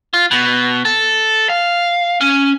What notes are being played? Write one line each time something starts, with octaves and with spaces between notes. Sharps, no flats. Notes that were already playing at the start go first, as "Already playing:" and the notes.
F4
B2
A4
F5
C#4